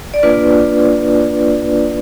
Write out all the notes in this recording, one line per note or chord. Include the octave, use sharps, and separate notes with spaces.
D5
A#3 D4 F4 B4